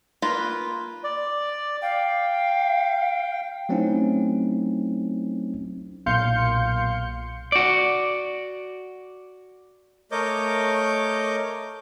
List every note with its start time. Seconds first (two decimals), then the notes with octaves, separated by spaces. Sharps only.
0.22 A#3 F4 B4
1.04 D5
1.82 F5 G5
3.69 F#3 A3 C4 C#4 D#4 E4
6.06 B1 A#2 F5 C6 G6 C#7
7.52 F#4 D5
10.12 A3 A#4 C#5 D#5 D6 G6